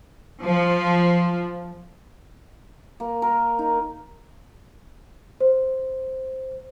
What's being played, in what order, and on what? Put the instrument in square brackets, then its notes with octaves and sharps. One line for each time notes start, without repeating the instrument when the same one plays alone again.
[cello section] F3
[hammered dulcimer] A#3
A#4
D#4
[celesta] C5